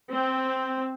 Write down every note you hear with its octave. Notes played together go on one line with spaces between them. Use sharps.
C4